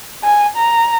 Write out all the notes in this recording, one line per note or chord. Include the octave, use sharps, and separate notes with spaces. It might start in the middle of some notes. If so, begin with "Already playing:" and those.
G#5
A#5